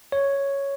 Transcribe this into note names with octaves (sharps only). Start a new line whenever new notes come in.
C#5